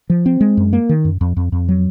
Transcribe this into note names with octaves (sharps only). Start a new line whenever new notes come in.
F3
C4
G#3
F#2
A#3
D#3
F#2
F2
F2
F2
F#3